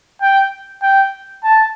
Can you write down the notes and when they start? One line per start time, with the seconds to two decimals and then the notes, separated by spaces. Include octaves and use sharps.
0.22 G5
0.83 G5
1.44 A5